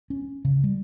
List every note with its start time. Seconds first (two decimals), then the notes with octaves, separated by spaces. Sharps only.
0.10 C#4
0.45 C#3
0.64 G3